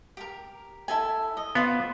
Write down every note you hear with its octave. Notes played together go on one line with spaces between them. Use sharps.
G4 A#4
E4 A4 G#5
D#5
B3 F4 C5 F5